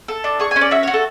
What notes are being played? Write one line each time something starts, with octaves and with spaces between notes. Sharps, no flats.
A4
D4
G#4 C#6
G#5
C#4
D5
F#4 E5
F#4 C#5
A4